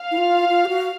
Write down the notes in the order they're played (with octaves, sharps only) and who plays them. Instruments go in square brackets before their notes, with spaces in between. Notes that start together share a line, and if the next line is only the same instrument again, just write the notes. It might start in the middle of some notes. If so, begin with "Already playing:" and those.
Already playing: [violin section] F5
[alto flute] E4
F4
F4
G4
F#4